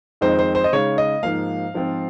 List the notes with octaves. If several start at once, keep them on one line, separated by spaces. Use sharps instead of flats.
F2 D#3 G#3 C4 D#4 C5
C5
C5
D#5
C#3 G#3 D#4 C#5
D#5
G#2 F3 A#3 F5
G#2 F3 C4 F4